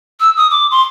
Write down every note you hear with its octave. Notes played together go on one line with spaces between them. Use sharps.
E6
D#6
D6
C6